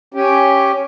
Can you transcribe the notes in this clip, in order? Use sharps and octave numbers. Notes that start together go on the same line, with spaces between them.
C#4 G4